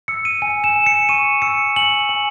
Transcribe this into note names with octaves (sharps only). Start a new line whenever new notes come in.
E6 C#7
D#7
G#5 D#7
E7
G#5
C#7
C#6 D#7
E6 C#7
G#5 F#7
G#5